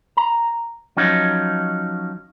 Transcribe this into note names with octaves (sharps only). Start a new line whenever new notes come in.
A#5
F3 F#3 C#4 D#4